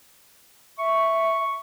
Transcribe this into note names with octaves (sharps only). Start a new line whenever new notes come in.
E5 C#6